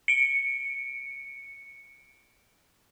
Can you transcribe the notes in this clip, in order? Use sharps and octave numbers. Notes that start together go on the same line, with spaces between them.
C#7 D7